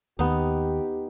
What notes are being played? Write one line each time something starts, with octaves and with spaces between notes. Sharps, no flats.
D#2 B3 D#4 G4